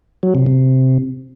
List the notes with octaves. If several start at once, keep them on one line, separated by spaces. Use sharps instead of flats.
F#3
C3
C3